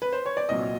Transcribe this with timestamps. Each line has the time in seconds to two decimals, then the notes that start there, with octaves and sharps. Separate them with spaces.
0.02 B4
0.12 C5
0.26 C#5
0.37 D5
0.49 C2 A#2 F#3 D#5